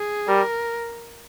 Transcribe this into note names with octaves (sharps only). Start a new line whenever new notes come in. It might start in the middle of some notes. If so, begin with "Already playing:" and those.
Already playing: G#4
G3 A#4